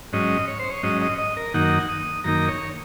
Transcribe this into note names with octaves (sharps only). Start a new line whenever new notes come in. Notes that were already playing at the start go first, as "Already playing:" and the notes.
G#2 F#3 C#4 D#5
C#5
C5
C#5
G#2 F#3 C#4 D#5
D#5
D#5
A#4
F#2 D#3 A#3 D#4 F#5
D#6
F#2 D#3 A#3 D#4 A#5
C#5